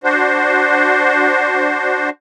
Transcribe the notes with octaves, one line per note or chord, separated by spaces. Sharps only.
D4 F#4 C5